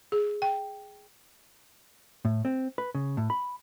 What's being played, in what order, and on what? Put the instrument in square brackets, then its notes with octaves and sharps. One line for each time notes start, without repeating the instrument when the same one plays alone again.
[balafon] G#4
G5
[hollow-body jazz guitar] A2
C4
B4
C#3
A2
B5